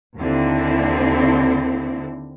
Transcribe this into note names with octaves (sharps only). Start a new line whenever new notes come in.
D#2 D3 C4 E4